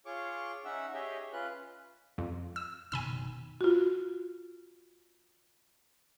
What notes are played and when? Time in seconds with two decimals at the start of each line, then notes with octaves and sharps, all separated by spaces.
0.06 F4 G#4 C#5 C#6 D6
0.65 C#4 D#4 E5 F#5 E6
0.94 G4 G#4 C#5 D#5 E5 G5
1.33 C#4 F4 B4 F#6
2.18 F2
2.56 E6
2.92 F#1 B2 D#3 G#5 B5 E6
3.61 F4 F#4